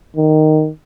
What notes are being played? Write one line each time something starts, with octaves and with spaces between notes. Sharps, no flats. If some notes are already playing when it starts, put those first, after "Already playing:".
D#3